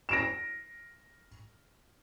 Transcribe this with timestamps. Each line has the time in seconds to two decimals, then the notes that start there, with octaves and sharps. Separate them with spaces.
0.09 A#6 D7 E7